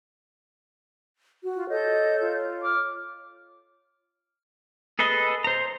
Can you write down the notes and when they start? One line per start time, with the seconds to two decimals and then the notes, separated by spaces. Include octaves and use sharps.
1.44 F#4
1.56 F4
1.69 A4 C#5 D#5 G6
2.21 F4
2.61 D6 F6
4.99 G#4 A4 B4 D#5
5.44 C5 A#5